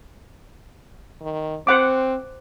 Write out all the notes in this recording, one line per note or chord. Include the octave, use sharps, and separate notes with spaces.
D#3
C4 C5 F#5 D6